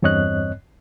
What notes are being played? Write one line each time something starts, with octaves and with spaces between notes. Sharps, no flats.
E2 G2 C4 C#5 D#5 F#6